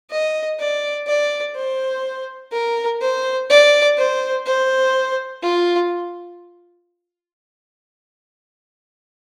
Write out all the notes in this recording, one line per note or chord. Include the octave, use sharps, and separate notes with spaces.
D#5
D5
D5
C5
A#4
C5
D5
C5
C5
F4